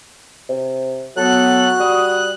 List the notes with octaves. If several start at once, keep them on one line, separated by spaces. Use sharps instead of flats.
C3
F#3 B3 F#4 A4 F#6
G3 D#6